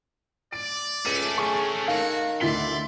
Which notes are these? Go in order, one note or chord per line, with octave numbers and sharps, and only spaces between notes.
D5 D7
C#2 A3 C#4 D#7
G#4 C#6
D#3 F#4 F5
D2 E4 D5 C6 B6